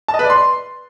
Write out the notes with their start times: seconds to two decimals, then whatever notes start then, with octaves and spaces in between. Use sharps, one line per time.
0.08 A5
0.14 D#5
0.19 B4
0.24 D5
0.30 C6